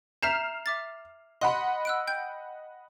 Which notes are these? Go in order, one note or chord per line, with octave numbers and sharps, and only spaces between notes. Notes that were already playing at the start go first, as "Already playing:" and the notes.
E5 A#5 F6 G6 C7 E7
E5 D6 A6
D#5 F#5 B5 C6
E6 F#6 D7
G5 G6